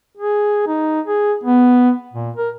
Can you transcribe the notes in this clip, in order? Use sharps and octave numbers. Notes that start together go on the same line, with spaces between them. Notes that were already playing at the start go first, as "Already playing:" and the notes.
G#4
D#4
G#4
B3
A#2
A#4